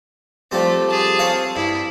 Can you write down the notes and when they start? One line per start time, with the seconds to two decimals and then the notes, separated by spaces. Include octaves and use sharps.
0.51 F3 G3 A3 C4
0.89 G#4 A5
1.19 C4 C#5 F5
1.56 G2 E4